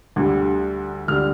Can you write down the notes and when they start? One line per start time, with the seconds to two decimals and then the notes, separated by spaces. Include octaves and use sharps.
0.16 D2 D3 G3
1.08 D2 D3 G3 D4 F6